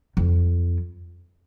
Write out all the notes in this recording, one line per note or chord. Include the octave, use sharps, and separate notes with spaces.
F2